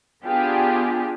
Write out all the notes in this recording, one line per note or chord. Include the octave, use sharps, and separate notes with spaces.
B3 D4 F4 G4 G#4